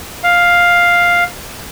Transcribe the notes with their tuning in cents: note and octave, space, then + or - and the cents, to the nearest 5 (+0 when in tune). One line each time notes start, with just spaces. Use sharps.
F5 +5